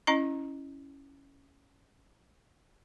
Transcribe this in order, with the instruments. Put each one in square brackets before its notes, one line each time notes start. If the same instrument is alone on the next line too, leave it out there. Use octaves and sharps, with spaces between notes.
[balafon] C#4 E4 D#5 A#5